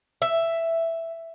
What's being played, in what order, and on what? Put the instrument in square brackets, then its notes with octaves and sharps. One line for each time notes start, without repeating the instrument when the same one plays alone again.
[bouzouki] E5